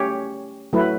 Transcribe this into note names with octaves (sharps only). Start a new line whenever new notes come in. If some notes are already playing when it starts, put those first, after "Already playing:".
Already playing: A3 C#4 G4 C#5
F#3 A3 E4 B4